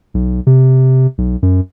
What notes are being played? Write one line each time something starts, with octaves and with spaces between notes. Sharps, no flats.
B1
C3
B1
F#2